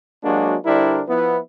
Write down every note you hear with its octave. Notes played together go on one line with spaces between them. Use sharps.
F#3 G#3 A#3 D4 F#4 G4
D3 G3 D4 E4 A#4 C5
F3 B3 E4